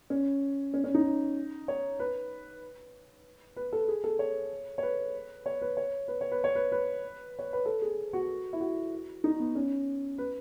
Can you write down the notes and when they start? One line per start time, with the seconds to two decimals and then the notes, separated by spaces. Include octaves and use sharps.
0.10 C#4
0.74 C#4
0.84 C#4
0.94 D#4
1.68 C#5
1.99 B4
3.56 B4
3.73 A4
3.88 G#4
4.04 A4
4.19 C#5
4.78 C#5
4.83 B4
5.46 C#5
5.62 B4
5.77 C#5
6.08 B4
6.21 C#5
6.32 B4
6.44 C#5
6.55 B4
6.72 B4
7.39 C#5
7.53 B4
7.66 A4
7.82 G#4
8.13 F#4
8.53 E4
8.60 F#4
9.24 D#4
9.40 B3
9.55 C#4
10.18 B4